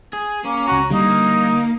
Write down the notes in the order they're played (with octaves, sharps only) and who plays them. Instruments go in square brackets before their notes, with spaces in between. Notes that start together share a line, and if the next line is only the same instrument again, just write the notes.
[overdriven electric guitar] G#4
[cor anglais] A#3 [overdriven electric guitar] C#4
[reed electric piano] C#2 A#5 [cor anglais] F#4
[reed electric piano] D3 G3 [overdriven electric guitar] A#3 [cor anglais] D#4